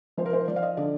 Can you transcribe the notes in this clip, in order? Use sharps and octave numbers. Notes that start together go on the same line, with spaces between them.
F3 C5
A#4
C5
F3 D5
F5
D#5
D3 D5